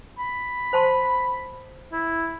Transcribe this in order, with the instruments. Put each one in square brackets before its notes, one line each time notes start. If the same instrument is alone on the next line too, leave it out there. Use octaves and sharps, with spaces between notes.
[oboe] B5
[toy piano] C5 A5 C6
[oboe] E4